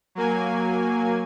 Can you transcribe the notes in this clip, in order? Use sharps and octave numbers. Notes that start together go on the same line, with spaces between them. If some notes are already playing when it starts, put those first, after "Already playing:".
F#3 A#3 G#5